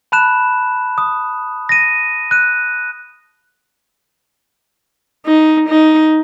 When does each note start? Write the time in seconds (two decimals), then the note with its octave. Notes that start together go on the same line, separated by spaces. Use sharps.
0.12 A5 B5 F#6 E7
0.98 D#6
1.69 A#6 D#7
2.31 F#6 D#7
5.26 D#4
5.69 D#4